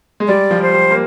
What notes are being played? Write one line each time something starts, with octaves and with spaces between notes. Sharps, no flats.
G#3
G3 D5
F3
C5
G3
A#3